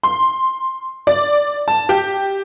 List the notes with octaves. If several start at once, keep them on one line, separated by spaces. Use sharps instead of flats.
C6
D5
A5
G4